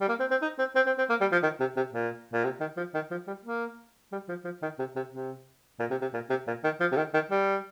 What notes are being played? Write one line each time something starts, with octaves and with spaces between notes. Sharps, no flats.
G3
A#3
C4
C4
D#4
C4
C4
C4
C4
A#3
G3
F3
D#3
C3
C3
A#2
A#2
C3
D#3
F3
D#3
F3
G3
A#3
G3
F3
F3
D#3
C3
C3
C3
A#2
C3
C3
A#2
C3
A#2
D#3
F3
C3
D#3
D#3
G3